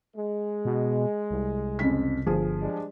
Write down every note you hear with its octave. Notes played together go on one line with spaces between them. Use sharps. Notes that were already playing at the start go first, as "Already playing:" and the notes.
G#3
B2
C2
F2 C#3 B6
G1 F3 G#4
G3 G#3 D4